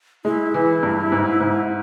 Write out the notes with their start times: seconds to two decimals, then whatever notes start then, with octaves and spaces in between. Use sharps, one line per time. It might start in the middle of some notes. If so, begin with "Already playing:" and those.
0.25 G#3 E4
0.54 E3
0.83 G2
1.12 G#2
1.40 G#2